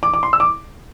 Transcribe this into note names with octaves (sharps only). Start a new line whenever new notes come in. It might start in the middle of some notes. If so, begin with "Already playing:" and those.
D6
D6
C6
E6
D6